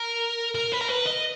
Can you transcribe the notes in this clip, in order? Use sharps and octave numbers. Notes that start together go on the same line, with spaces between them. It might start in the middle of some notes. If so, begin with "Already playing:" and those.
Already playing: A#4
A#4
B4
A#4
B4
D#5